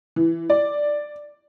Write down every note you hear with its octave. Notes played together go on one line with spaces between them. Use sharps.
E3
D5